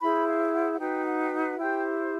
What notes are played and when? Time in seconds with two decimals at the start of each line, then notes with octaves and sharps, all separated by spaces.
0.01 E4 G#4 C5 B5
0.27 F5
0.53 F#5
0.73 F#5
0.79 D#4 F#4 B4 G5
1.06 F#5
1.23 G5
1.33 F#5
1.58 E4 G4 C5 G5